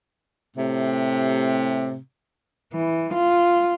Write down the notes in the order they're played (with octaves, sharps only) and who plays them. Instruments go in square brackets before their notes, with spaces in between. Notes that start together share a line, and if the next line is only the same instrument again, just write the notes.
[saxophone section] A2 C3
[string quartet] E3
F4